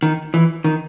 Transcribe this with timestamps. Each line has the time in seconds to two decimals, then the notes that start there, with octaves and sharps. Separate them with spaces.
0.03 D#3
0.34 E3
0.64 D#3